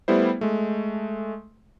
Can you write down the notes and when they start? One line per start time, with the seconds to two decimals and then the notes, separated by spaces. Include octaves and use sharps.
0.08 G3 A3 B3 E4 C5
0.41 G#3 A3